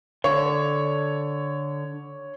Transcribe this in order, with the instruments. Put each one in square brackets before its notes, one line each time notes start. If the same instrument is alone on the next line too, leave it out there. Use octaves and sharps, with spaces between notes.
[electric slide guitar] D3 [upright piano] C#5